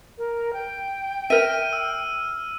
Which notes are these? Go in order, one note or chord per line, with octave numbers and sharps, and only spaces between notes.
A#4
G5
A#4 E5 F6 D#7
E6